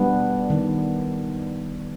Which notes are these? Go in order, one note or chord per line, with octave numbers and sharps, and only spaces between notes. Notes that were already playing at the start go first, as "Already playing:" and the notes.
Already playing: G3 B3 D4
D#3 G3 B3